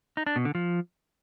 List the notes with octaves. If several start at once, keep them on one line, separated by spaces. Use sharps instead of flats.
D#4
D4
B2
D3
F3